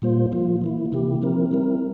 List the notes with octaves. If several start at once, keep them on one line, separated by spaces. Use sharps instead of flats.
A#2 G3 A#3 F4 C5
F3 A#3 F4
E3 A#3 E4
C3 E3 A#3 E4 G4
F3 C4 E4 A#4
G3 C4 E4 A#4